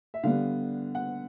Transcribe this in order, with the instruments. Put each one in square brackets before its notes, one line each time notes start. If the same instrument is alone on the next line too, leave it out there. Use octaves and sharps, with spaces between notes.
[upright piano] E5
D3 G3 B3 F5
F#5